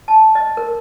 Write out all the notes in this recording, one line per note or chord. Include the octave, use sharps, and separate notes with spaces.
A5
D#5
A#4